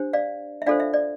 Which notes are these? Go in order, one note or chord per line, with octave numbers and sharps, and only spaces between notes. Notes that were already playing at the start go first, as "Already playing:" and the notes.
Already playing: D4 G4 C5
D5 F5
E5
D4 F4 A4 C5 D5 F5
E5
D5